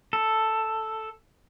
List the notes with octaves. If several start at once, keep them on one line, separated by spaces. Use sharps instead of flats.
A4